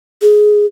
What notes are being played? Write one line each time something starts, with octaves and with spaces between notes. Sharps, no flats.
G#4